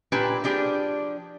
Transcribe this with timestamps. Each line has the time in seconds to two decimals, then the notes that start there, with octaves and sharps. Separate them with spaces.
0.12 A#2 D4 G4 B4 G#5
0.44 F3 D4 G4 G#4 D5